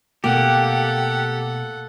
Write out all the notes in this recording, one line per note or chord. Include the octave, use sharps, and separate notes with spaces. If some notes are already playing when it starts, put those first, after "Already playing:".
B2 A3 A#3 G4 A4 F#5